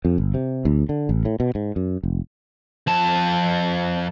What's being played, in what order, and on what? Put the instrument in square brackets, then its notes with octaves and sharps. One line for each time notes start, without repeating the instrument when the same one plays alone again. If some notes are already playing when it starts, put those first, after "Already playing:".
[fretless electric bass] F2
G1
C3
D2
D3
A1
A2
B2
G#2
F#2
F1
[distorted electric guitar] F2 A5